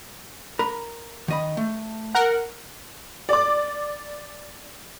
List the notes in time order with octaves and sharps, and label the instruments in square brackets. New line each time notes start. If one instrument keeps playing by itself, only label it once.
[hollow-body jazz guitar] A#4 B5
D#3 D#5 B5
A3
[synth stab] A#4 F#5
[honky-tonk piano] D5 D6